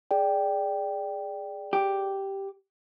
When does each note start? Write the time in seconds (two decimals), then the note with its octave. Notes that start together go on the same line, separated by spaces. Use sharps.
0.11 G#4 D5 G5
1.73 G4